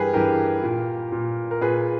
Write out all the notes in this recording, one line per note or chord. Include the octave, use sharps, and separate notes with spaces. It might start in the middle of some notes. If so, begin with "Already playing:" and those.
Already playing: G2 E3 G4 G#4 A#4 B4
G2 E3 G4 A#4
A#2
A#2
A#4
A#2 G#4 B4